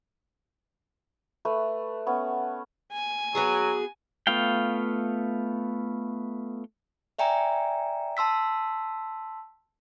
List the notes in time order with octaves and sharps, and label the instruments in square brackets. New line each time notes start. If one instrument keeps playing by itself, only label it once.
[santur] A3 B4
B3 C#4
[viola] G#5
[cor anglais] F#3 [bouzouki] B3 F#4 G#4
[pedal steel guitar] A3 B3 F4 F5 G5
[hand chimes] D5 E5 G5 G#5 A#5
A5 C6 E6 B6